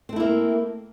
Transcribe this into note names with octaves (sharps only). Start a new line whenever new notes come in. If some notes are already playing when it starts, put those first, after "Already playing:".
A3 A#3 C4 E4